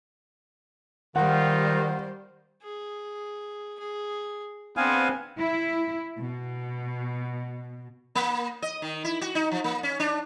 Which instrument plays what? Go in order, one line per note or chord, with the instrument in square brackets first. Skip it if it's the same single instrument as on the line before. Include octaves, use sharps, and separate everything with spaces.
[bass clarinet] D#3 [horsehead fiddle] G3 C5 [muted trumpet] F4 [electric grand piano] F#5
[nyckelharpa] G#4
G#4
[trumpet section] B3 C4 [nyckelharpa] D4 G#4 [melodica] F5 G#5
[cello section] E4
B2
[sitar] A#3
D#5
D#3
E4
F#4
D#4
F3
A#3
C#4
D4